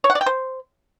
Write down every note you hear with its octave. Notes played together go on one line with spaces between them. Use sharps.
C#5
F#5
D5
G5
C5